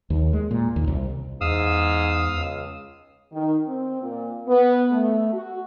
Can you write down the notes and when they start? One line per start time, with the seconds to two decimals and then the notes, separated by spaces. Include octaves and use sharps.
0.10 D#2
0.33 G#3
0.51 A#2
0.76 D#2
0.87 C2
1.41 E2 G#2 F5 D#6 E6
2.37 C#2
3.33 D#3
3.67 C4
4.02 A#2
4.48 B3
4.91 A3
5.32 F#4